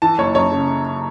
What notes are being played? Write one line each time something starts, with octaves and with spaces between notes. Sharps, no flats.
E3 A5
F#1 C#5
F#2 C#5
C#3